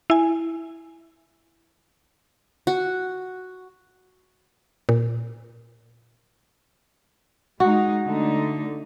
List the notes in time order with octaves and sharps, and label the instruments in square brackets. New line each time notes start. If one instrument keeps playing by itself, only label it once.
[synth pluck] E4 G#5
[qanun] F#4
[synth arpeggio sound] A#2
[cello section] G#3 D#4 [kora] F#4
[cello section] D3 A3 D#4